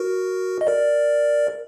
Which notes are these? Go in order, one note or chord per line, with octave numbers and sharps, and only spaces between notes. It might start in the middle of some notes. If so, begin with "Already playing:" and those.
Already playing: F#4 A#4
D#5
A#4 D5